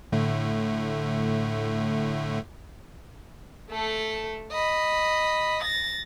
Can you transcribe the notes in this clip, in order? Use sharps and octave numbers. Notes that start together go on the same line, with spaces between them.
A2 D3 A3
A3 A4
D#5 B5
A6 A#6